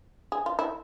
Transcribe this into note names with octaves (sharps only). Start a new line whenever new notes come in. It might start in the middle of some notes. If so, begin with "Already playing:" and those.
G#4
F4
E4